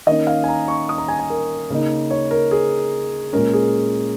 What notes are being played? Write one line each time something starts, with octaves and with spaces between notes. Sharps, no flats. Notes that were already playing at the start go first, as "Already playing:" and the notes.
D#3 A#3 C#4 D#5
F5
G#5
A#5
C#6
D#6
A#5
G#5
G#5
A#4
C#3 A#3 D#4
C#5
A#4
G#4
A#2 G#3 C#4 A#4
G#4